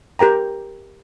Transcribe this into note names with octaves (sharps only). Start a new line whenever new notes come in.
G4 A#4 G5 A#5